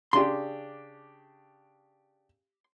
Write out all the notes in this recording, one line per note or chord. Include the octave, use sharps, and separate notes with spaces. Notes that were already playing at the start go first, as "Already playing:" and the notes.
C#3 D4 G4 C6